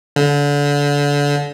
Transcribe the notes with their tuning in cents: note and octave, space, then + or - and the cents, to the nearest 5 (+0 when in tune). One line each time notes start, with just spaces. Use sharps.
D3 -30